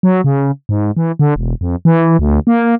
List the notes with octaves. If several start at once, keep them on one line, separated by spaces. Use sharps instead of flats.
F#3
C#3
G#2
E3
D3
E1
F2
E3
D2
A#3